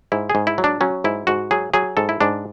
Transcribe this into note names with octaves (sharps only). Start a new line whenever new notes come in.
G#2 E4
G#4
G#2
E4
F#3
D4
F#3 C#4
G#2 E4
G#2 F#4
F#3 G#4
F#3 G#4
G#2 A4
E4
G#2 D4